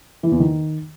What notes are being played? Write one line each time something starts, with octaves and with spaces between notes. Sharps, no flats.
E3
E2
D#3